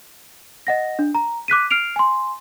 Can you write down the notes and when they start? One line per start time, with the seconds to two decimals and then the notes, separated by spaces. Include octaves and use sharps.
0.67 D#5 F#5 A#6
0.99 D4
1.15 A#5
1.48 D6 F#6 B6 D#7
1.71 F6 C7 D7 F7
1.96 G#5 C6